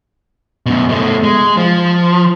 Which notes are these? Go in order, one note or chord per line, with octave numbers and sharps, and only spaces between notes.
F#2 B2
B2 A3
G#3
F3